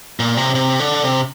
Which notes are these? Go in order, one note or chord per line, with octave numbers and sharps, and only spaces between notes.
A#2
C3
C3
D3
C3